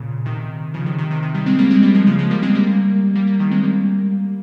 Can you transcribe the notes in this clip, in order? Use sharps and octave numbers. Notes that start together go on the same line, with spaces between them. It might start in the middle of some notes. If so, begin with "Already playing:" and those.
Already playing: A#2 C#3
C3 D#3
C#3 F3
C3 D#3
C3 D#3
C3 D#3
C3 D#3
D#3 G3
G#3 C4
G3 A#3
G#3 C4
G3 A#3
F3 G#3
C#3 F3
F3 G#3
G3 A#3
G#3 C4
G3 A#3
G3 A#3
G3 A#3
D#3 G3
G#3 C4
G3 A#3